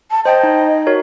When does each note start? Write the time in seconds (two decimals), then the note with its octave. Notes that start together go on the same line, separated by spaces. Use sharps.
0.11 A5
0.25 C5 D#5 G5 A5
0.43 D#4
0.87 F#4 A#4 C#5